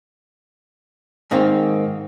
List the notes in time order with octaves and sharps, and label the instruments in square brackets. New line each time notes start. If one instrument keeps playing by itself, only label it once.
[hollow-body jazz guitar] G#2 D#3 A#3 C4